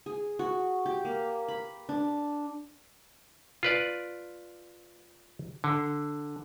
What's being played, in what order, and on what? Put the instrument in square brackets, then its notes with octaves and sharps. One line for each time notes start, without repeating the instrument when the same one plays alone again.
[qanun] G#4
F#4
G4
A#3
B5
D4
[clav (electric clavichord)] F4 B4 D5
D3